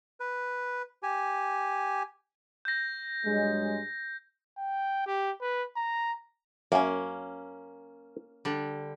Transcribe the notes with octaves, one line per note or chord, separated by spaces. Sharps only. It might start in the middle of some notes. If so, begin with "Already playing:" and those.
B4
G4 G#5
G6 A#6
G2 F#3 G#3
G5
G4
B4
A#5
F#2 A#3 C#4 G#5
D3 G3